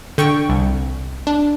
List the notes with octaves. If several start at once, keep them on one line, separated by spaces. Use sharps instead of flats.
D3 G5 C#6
C2
D4